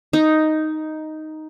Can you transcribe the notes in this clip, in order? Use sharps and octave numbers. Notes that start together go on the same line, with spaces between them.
D#4